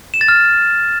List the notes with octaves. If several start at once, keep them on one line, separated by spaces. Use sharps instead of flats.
E7
A6
F6